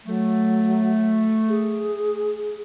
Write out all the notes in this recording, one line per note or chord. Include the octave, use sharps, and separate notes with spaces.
F#3 A3
G#4